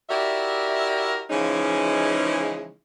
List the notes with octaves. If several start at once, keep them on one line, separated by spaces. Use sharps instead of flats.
E4 F#4 G4 A#4 D5 E5
C#3 E3 F3 G#3 C#4 D#4